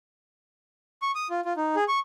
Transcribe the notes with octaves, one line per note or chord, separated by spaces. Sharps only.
C#6
D#6
F4
F4
D#4
G#4
C#6